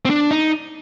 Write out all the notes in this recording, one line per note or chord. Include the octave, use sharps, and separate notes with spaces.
C4
D4
D#4